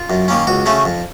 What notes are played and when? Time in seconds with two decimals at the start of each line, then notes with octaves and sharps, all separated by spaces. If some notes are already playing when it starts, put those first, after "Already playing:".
Already playing: F4
0.10 F#2
0.28 D#3 A#3 C#4
0.47 C#2 F#4
0.66 C#3 A3 C#4
0.85 F2